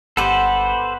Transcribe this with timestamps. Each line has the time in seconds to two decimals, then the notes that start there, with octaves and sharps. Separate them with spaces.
0.17 G1 B3 G4 A4 B4 C5